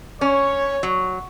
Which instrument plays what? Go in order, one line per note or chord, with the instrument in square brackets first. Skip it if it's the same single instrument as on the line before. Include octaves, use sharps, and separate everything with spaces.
[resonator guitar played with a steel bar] C#4 [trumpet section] C#5
[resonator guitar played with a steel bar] F#3